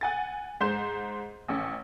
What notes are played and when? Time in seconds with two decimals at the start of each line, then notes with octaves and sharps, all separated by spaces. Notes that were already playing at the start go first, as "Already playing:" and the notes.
0.01 F#5 G#5 A6
0.61 G#2 C5 C6 G6 E7
1.48 A1 C#4